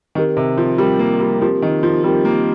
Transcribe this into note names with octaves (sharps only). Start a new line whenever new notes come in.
D#3 C4 G4 A#4
C3
F3
G3 C4 G4 A#4
A#3
G3
F3 C4 G4 A#4
D#3
F3
G3 C4 G4 A#4
A#3